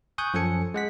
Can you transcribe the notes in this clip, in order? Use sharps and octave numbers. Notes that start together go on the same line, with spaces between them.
G#5 C#6 D#6 F#6 G6
F#2 F3 A4 G#5 C#7
G#3 F#5 B6